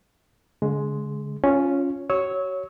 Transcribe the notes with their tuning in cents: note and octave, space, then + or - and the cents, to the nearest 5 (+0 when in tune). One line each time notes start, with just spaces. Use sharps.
D3 -45 G#3 +10
C#4 +0 F4 +0
F#4 +35 C#5 +0 E6 -30